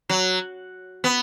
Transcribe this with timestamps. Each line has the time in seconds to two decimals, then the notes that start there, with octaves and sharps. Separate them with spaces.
0.09 F#3
1.04 B3